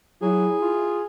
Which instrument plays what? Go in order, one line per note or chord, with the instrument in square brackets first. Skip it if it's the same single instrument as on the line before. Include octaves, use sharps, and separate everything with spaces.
[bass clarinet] F#3 [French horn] E4 [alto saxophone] G#4
[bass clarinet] F4